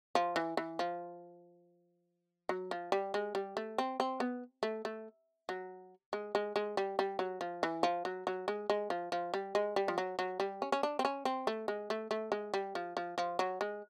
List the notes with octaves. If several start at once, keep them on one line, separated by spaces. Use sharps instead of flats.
F3
E3
E3
F3
F#3
F3
G3
G#3
G3
A3
C4
C4
B3
A3
A3
F#3
G#3
G#3
G#3
G3
G3
F#3
F3
E3
F3
F#3
F#3
G#3
G#3
F3
F3
G3
G#3
G3
F3
F#3
F#3
G3
C#4
C#4
D4
C4
C#4
C4
A3
G#3
A3
A3
G#3
G3
F3
F3
F3
F#3
G#3